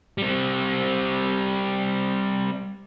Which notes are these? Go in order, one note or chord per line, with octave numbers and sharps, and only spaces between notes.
G3 C4